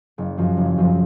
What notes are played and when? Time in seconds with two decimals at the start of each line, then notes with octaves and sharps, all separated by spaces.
0.18 F#1
0.38 F#2 F3
0.57 F#1
0.78 F#2 F3